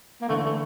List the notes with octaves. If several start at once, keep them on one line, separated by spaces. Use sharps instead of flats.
A#3
D3 E3 A3
A3